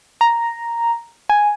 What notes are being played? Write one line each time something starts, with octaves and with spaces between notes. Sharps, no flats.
A#5
G#5